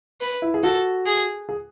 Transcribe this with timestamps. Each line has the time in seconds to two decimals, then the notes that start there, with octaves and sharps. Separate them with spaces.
0.21 B4
0.42 E4
0.54 G#4
0.63 F#4 A4
1.06 G#4
1.49 G#4